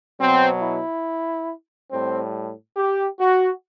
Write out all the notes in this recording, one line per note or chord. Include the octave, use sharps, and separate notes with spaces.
B2 F#3 C4
E4
A2 G3 C4
G4
F#4